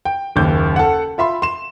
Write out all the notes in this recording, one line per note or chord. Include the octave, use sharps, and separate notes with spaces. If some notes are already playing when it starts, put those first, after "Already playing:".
G5
F#1 D#2 G6
A4 F#5
F4 E5 B5 C6
C6 E7